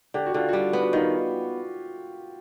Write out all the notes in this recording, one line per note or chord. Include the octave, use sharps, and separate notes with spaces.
D3 G4
F#4
D3 F4
G3 F#4
B3
F#4
D#3 F4